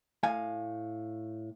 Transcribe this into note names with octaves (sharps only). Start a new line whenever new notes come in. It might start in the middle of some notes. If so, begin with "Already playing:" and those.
A2 F5 G#5